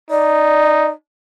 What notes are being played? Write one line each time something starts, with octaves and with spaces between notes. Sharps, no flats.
D#4 D5